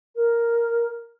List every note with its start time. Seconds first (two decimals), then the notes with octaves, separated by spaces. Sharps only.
0.16 A#4